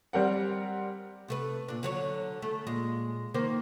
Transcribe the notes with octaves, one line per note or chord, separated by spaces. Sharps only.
G3 C4 G4 A#4 D5 F#5
C3 A3 B4
A#2 D4
D3 F#3 C#5
A3
A#2 G#3
D#3 A#3 C5